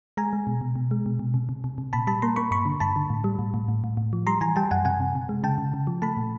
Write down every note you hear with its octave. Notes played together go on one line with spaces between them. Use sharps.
G#3 G#5 A#5
G#3
B2
B2
B2
G#3
B2
B2
C3
C3
C3
C3
A#2 A5 B5
G3 A5 B5
A#3 A#5 C6
A#3 B5 C#6
G2 B5 C#6
D3
G2 A5 B5
D3
A2
G3
A2
A2
A2
A2
A2
F3
G3 A#5 C6
E3 G#5 A#5
G3 G5 A5
F#2 F#5 G#5
C3 F#5 G#5
C3
C3
G#3
C#3 G5 A5
C#3
C#3
F3
A3 A5 B5
A#2